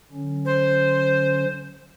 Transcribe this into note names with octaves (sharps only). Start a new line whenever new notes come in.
D3 F#3 C#4
C5